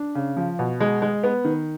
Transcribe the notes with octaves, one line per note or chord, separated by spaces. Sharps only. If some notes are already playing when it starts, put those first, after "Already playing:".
Already playing: D4
C#3
F3
B2
G#3
G#3
B3
D#3